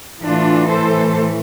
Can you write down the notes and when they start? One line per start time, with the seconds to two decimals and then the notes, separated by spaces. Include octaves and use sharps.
0.23 A2 E3 A3 D4 F4
0.69 A4 C5